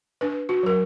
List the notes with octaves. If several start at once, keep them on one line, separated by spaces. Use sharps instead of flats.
D4 B4
F#4
F#3 A#4